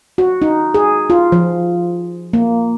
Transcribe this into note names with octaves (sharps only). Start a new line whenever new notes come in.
F#4
D#4
G#4
F4
F3
A#3